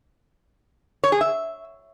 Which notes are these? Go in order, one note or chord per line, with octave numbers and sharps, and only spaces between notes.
C#5
G#4
E5